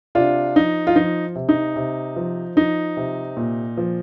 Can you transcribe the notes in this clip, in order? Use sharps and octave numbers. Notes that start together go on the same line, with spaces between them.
C3 D4 F4
F3 D#4
F4
F3 D#4
C3
D#4
C3
F3
F3 D#4
C3
A#2
F3